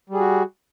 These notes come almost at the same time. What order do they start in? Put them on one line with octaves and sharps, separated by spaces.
G3 G#4 F#4